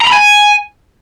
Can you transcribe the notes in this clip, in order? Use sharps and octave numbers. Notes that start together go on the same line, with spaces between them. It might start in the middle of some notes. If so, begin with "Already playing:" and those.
A#5
B5
G#5